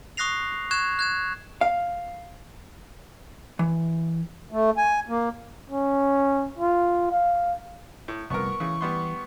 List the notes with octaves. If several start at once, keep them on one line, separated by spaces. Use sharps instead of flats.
C#6 D#6 F#6 A#6 C7 F7
C#6 F#6 G#6 E7
F#6 G#6 E7
F5
E3
A3
G#5
A#3
C#4
F4
F5
A2
F1 C2 F3 B3 A#4 C#6
C#3 E3
G3 B3 C6